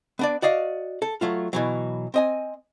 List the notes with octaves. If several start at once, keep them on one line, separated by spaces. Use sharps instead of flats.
B3 D4 D5
F#4 D5 D#5 F5
A4
F#3 A3 F4
B2 E3 F#3
C4 D#5 G#5